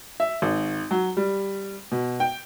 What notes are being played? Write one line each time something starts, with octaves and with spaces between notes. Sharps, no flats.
E5
G#1
F#3
G3
B2
G5